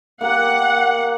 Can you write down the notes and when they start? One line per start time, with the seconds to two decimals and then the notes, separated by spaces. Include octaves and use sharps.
0.21 A#3 G4 A#4 F#5